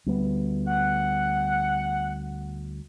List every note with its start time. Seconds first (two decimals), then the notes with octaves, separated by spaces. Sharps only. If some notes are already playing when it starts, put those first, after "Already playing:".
0.06 D2 G3 B3
0.68 F#5